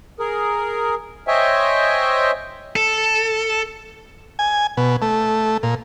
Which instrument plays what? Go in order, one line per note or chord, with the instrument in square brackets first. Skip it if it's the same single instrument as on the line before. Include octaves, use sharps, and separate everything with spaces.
[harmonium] G#4 A#4
C5 C#5 D#5 E5 G5 G#5
[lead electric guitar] A4
[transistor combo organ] G#5
B2
A3
A#2